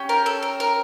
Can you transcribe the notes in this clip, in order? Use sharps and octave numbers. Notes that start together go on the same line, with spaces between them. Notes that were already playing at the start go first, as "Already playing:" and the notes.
Already playing: C#4 G4
A#4
A4
A#4
A#4